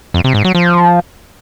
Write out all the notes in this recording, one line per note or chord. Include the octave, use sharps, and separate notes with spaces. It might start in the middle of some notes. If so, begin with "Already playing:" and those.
F2
C3
G#2
F#3
F3